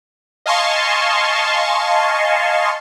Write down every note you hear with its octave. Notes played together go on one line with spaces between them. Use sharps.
D#5 F5 G#5 A5 C6 C#6